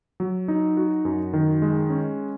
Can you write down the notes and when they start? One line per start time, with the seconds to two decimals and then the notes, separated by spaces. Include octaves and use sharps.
0.20 F#3
0.48 D#4
0.77 F#4
1.05 F#2
1.33 D#3
1.62 G#3
1.90 C#4